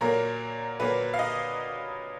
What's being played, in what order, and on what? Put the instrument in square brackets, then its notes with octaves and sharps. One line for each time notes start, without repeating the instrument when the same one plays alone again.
[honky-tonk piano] A#2 F#3 A#3 A#4
A#2 F#3 A#3 B4
F5
D#5